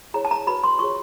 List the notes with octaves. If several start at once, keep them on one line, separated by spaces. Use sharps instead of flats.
E4 G#4 C#5 A#5
A5
A#5
F#4 B4 B5
C6
F4 G#4 C#5 C#6